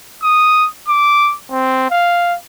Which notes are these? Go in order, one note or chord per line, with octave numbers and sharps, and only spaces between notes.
D#6
D6
C4
F5